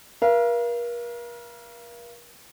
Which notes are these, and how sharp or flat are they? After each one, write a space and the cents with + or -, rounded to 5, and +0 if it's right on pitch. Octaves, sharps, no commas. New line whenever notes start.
A#4 +40 F5 -35